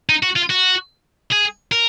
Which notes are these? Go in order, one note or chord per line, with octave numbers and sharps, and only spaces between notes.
D#4
F#4
F4
F#4
G#4
A#4